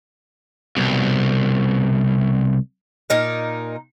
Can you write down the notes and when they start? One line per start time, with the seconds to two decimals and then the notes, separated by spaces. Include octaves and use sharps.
0.77 C2 B2
3.10 A#2 D#4 A#4